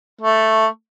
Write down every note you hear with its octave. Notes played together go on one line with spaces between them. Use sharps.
A3